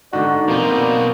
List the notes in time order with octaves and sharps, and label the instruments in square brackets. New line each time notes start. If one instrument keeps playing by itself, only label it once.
[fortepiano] G#2 D3 [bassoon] F#4 [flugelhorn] D5
[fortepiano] F2 C4 [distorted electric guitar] B2 D#4 [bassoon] A#3